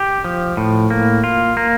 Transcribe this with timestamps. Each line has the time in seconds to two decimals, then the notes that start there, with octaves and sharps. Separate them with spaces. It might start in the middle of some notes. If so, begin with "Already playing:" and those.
Already playing: G4
0.24 F3
0.57 A2
0.90 A#3
1.24 F4
1.57 A#3